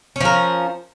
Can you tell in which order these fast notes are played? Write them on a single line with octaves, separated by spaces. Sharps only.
C#4 F3 A#4